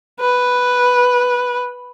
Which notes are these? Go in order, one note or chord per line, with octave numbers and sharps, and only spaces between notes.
B4